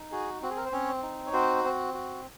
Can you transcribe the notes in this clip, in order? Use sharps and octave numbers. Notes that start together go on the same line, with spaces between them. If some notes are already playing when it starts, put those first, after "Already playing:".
Already playing: D#4
F#4 G#4
C4 F#4
G#4
A#4
C5
C4 C#4 C#5
D#4
C#5
C4 F#4 C5
C4
F#4